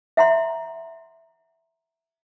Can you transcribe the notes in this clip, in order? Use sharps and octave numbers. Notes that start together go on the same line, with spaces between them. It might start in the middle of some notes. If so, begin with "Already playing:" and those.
E5 F#5 A#5 C6